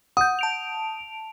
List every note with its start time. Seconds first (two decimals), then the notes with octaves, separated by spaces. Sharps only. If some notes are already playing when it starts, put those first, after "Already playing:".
0.17 F#5 D#6 G6
0.39 A5 D7 F7